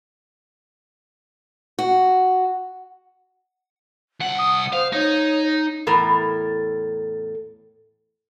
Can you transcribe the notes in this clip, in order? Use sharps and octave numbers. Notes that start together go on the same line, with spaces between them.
F#4
C2 F#5
D#6
C5 F5
D#4 C#5
E2 A2 A4 A#4